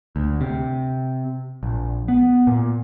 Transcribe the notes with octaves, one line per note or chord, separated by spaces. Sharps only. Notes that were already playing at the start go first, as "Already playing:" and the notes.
D2
C3
A#1
B3
A#2